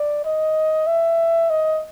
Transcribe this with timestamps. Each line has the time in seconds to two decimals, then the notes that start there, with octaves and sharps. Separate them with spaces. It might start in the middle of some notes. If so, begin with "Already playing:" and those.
Already playing: D5
0.25 D#5
0.87 E5
1.50 D#5